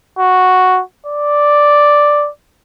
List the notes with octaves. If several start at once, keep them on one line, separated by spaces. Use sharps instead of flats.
F#4
D5